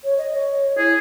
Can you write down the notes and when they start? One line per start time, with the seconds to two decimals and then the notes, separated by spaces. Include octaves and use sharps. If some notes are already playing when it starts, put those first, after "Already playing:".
0.04 C#5
0.18 D#5
0.33 C#5
0.78 E4 G#4